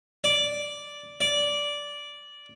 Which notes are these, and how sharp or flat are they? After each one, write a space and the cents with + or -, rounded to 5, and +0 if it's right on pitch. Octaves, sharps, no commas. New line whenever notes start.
D5 -5
D5 -10